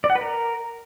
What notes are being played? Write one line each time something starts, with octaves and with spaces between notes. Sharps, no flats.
D5
F#5
B4
A#4